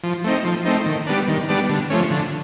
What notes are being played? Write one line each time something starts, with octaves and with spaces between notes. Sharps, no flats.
F3
A3 C4 D#4
F3
A3 C4 D#4
D#3
G3 B3 D4
D#3
G3 B3 D4
D3
F3 A3 C#4
D3